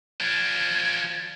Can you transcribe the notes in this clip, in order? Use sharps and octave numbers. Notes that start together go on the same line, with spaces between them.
F3 D4 G#6